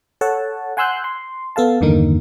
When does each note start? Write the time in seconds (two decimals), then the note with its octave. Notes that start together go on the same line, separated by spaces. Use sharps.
0.21 A4 C#5 F#5 A5
0.77 F#5 G#5 C6 E6 F#6 G6
1.04 C6
1.56 B3 A4 F5 A5
1.81 E2 G2 D3 D#3 A#3 D#4